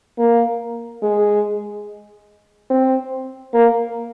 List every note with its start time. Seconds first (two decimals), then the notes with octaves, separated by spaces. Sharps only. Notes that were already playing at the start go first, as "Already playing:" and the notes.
0.18 A#3
1.02 G#3
2.70 C4
3.54 A#3